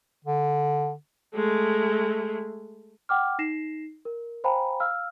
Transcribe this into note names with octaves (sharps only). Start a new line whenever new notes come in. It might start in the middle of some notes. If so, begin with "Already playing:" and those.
D3
G#3 A3
F#5 G5 D6 F6
D#4 A#6 C7 E7
A#4
C5 F5 G5 G#5 A#5 B5
F5 E6 F6